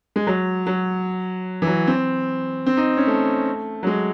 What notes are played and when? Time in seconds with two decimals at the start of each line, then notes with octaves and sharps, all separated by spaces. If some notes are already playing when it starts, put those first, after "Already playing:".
0.16 G#3
0.27 F#3
0.67 F#3
1.62 E3
1.67 F#3
1.87 C4
2.66 C4
2.77 D#4
2.97 C#4
3.07 A3
3.83 F#3
3.87 G#3